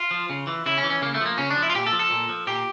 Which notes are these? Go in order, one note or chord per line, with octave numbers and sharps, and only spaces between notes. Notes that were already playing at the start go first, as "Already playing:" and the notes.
Already playing: F4
F3
C#3
E3
C#3 E4
C#4
E3
C#4
C#3 A#3
A3
F3 A#3
C#3 C#4
D4
F3
E4
F4
A#2 G4
A4
F3
A4
A#2
F3
A#2 G4